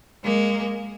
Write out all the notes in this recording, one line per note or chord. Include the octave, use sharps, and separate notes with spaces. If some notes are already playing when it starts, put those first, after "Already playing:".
G#3 A#3